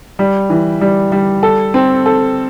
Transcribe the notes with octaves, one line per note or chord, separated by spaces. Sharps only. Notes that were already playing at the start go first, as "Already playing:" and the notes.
G3
E3
G3
G3
A4
C4
A4